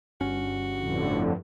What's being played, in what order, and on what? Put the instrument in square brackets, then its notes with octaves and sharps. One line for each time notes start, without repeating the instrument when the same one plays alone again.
[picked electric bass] G1 C#4 [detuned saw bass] G2 [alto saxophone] F#4
[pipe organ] F2 A2 D3